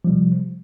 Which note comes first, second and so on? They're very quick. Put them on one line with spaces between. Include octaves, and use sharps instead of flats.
F3 G3 C3